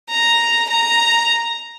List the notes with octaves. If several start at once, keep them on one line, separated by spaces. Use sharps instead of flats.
A#5
A#5